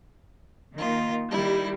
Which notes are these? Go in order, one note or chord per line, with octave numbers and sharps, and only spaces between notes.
D#3 A#3 F4
D#3 G3 E4